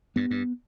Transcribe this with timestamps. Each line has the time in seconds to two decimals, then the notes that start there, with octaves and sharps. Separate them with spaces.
0.16 G2 B3
0.31 G2